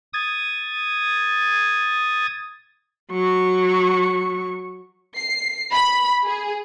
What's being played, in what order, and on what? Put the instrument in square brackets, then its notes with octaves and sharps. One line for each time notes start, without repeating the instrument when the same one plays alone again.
[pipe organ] D#6 G#6 A6
[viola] F#3 C#6
[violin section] C7
B5
G#4